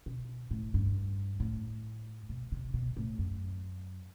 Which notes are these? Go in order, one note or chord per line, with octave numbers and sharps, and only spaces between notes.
B2
A2
G2
A2
B2
C3
B2
A2
F#2